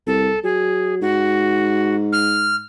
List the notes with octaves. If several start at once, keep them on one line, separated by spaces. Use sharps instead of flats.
C2 A4
F#3 G#4
G#2 F#4
F6